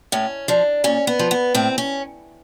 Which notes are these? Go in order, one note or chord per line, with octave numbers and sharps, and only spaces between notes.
A2 C#4
F3 D4
A#2 C#4
B3
F3
B3
A2 C4
C#4